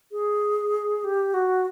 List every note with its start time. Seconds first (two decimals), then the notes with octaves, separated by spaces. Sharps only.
0.12 G#4
1.04 G4
1.34 F#4